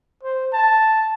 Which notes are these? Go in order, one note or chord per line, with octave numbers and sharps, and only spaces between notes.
C5
A5